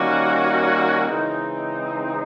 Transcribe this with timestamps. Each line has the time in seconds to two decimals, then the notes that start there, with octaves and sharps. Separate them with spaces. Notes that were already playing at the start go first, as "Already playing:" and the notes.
Already playing: D#3 G3 A#3 C#4 F#4
1.07 C#3 E3 G#3 C4 D#4